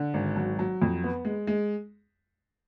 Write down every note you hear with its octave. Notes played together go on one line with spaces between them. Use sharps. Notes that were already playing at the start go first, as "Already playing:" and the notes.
Already playing: D3
G#1
F#3
F#3
F2
B3
G#3
G#3